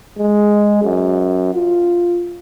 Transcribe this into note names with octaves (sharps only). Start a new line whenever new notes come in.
G#3
F#2
F4